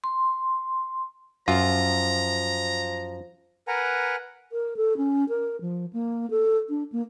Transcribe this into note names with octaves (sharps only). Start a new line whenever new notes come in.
C6
F#2 F3 F4 A#5
A#4 B4 F#5 G#5 A#5
A#4
A4
C#4
A#4
F3
A#3
A4
D4
A#3